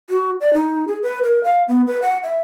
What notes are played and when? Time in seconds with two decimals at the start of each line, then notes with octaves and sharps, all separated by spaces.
0.10 F#4
0.41 D5
0.53 D#4
0.88 G#4
1.03 B4
1.23 A#4
1.44 F5
1.68 B3
1.87 B4
2.02 F#5
2.23 E5